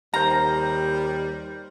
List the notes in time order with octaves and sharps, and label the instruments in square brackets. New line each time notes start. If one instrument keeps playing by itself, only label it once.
[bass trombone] D#2 [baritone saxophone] G3 [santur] A#4 C5 [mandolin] A#5